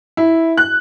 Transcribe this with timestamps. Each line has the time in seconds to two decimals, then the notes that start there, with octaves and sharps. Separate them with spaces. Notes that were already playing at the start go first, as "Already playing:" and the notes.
0.17 E4
0.57 F#6